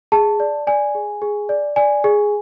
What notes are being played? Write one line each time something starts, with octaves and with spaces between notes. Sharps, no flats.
G#4 A5
D5
D5 G#5
G#4
G#4
D5
D5 G#5
G#4